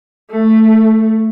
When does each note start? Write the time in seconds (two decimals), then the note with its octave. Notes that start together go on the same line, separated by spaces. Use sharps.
0.31 A3